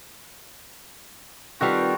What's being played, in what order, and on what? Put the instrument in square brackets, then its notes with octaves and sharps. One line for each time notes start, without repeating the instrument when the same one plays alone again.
[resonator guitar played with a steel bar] D#3 G3 [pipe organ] C4 F4 B4 [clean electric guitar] F#4 A4 F5